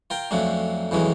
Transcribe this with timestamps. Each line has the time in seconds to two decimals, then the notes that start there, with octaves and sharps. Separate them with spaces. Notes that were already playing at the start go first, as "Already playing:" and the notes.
0.10 F4 A#4 G5
0.31 F2 F3 F#3 A3 C#4 D4
0.91 F2 E3 F#3 G#3 C#4